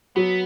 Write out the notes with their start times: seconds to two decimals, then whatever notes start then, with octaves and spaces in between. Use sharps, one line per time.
0.16 F#3 B3